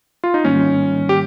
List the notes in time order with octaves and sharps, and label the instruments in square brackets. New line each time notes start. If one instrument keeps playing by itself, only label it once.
[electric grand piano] F4
D#4
[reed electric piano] G#2 D#3 G3 A#3 [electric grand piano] C#4
[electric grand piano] G4